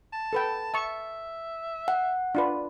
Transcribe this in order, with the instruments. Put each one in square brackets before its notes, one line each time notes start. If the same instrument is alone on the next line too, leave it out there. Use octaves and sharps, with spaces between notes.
[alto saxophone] A5
[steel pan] A4 B4 G5
[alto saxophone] E5 [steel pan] A5 C#6
[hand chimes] F#5
[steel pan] D4 F4 B4